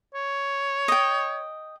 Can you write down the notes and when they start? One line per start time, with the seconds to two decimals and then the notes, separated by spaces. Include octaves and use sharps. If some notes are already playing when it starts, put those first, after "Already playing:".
0.14 C#5
0.88 D#5 G5